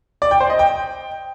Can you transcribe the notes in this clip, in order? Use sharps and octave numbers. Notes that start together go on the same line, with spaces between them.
D5
G5
C5
D#5
G5